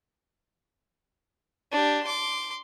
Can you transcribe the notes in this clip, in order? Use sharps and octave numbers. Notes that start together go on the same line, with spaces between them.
D4 G4
C6 D6